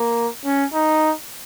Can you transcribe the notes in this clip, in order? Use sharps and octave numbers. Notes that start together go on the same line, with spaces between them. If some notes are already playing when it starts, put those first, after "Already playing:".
Already playing: A#3
C#4
D#4